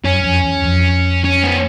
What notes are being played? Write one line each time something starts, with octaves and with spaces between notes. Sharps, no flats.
F#2 C#4
F2
E2
F2
C#4
B3